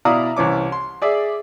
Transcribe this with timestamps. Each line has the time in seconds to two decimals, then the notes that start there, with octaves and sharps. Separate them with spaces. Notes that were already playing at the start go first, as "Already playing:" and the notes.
0.05 B2 E4 D5 F5 A#5 D#6
0.37 C2 E3 C#4 D6
0.72 C6
1.02 G#4 D5 E5